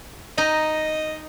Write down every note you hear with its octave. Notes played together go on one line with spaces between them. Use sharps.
D#4 D#5